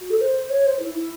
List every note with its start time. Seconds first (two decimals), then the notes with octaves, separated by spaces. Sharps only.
0.01 F#4
0.10 A4
0.21 C5
0.50 C#5
0.65 C5
0.79 E4
0.94 E4